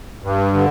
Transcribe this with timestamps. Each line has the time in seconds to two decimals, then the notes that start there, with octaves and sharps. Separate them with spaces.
0.22 G2
0.53 D3